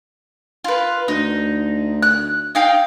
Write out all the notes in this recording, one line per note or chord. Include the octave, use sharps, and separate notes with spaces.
F4 B4
D2 D#4
F#6
D#4 F5 G5